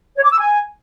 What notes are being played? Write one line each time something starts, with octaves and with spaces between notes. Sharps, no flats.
C#5
D6
E6
G#5